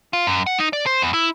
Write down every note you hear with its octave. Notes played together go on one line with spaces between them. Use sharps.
F4
F#2
F#5
D#4
D5
C5
E2
E4